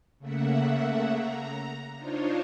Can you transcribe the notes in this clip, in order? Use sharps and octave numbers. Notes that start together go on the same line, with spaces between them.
C#3 A3 A#3 E5 F#5
A#5
D4 D#4 F4 C5 C#5